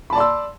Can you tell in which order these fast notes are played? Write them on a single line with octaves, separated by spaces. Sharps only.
B5 A5 D5 C6 E6